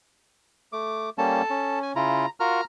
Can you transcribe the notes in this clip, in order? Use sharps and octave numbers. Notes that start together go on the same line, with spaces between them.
A3 D6
G3 A#3 C#4 A4 A5
C#4
G#5
C#3 E4 F4 A#5
F4 F#4 A#4 A#5 F6